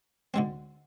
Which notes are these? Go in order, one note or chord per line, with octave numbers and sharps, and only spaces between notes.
D2 D3 G#3 C4